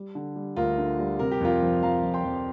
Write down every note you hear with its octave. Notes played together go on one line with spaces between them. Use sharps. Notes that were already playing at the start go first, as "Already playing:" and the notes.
Already playing: G3
D3
G3
D2 F4 A#4
D3
G3
C3 A#4
G4
F2 F4 A#4
F3
F3 F5 A#5
F2
G5 C6
F2